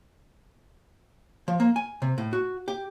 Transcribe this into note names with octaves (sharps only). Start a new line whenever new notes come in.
F3
A#3
G#5
C3
A2
F#4
G4